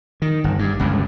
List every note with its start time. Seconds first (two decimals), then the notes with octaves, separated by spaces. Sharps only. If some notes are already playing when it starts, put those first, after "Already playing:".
0.22 D#3
0.44 G1
0.59 G2
0.79 G1 C#2 F#2